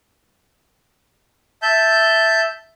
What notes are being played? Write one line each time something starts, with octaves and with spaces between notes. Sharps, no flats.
E5 A5 G6